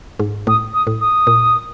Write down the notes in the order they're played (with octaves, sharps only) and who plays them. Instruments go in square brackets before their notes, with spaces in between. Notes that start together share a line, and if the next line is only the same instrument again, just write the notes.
[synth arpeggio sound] G#2
[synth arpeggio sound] A2 [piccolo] D#6
[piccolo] D#6
[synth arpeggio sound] A2
[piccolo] D#6
[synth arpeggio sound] A#2